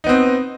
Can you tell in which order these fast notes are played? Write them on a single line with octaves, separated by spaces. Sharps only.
D#4 B3 C4